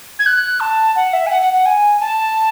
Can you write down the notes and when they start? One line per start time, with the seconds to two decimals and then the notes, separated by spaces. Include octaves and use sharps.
0.19 G#6
0.26 F#6
0.60 A5
0.96 F#5
1.13 E5
1.27 G#5
1.30 F#5
1.42 F#5
1.53 F#5
1.66 G#5
2.00 A5